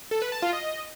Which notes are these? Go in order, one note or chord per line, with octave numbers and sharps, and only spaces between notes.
A4
B4
A5
F4
D#5